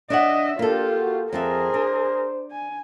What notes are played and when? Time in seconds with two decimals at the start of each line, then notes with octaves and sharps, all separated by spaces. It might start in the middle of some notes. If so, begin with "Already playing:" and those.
0.10 D4 C#5 D#5 E5 F#5
0.59 A#3 D4 F4 G4 A4
1.00 F#4
1.33 F2 F4 G#4 A#4 C5 E5
1.74 D4
2.51 G#5